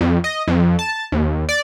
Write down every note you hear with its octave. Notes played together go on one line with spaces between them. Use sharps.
F2
D#5
F2
A5
D#2
D5